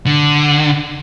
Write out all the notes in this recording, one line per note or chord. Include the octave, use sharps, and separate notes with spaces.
D3